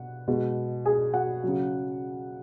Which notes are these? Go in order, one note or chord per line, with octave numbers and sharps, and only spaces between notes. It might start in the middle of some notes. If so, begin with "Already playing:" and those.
Already playing: B2 F#5
B2 G#3
G#4 G#5
F#4 F#5
C#3 F#3